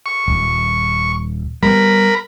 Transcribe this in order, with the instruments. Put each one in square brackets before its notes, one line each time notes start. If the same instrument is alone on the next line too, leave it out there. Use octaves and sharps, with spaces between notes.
[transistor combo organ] C#6
[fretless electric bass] D#1
[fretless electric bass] G3 A#3 B3 [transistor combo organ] A#4 B5